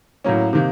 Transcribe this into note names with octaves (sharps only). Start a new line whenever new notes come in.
A2 F#3 A#3 C#4
C3 D#3 A#3